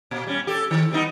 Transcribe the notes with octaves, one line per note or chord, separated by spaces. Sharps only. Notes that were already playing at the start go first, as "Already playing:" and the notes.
A#2
G3 C#4
G4 A4
D#3
G3 B3 D#4